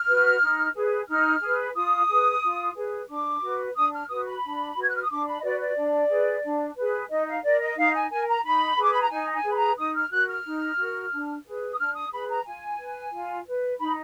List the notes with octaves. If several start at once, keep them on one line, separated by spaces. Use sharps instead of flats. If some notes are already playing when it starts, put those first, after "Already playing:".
Already playing: F6
F#4 B4
D#4
G#4 B4
D#4 F6
G#4 B4
F4 D#6
G#4 B4
F4
G#4 B4
D4 D6
F#4 B4
D4 D#6
F6
F#4 B4 D#6
B5
D4
F#4 B4 G#6
F#6
F6
D#6
D4 D6
B5
D#5
F#4 B4 D5
D5
D4
G#4 B4
D4
G#4 B4
D#4 D#5
F5
A#4 D5
D#5
D#4 F5
G#5
A#4 G#5
A#5
D#4 B5
G#4 B4 D6
B5
A#5
D#4 G#5
G#5
G#4 B4
B5
A#5
D#4 D#6
F6
F#4 A#4 F#6
F6
D#4
F#4 A#4
D4
G#4 B4
D#6
D4 F6
D#6
G#4 B4 B5
A#5
F4 G#5
B4
F4
B4
D#4 B5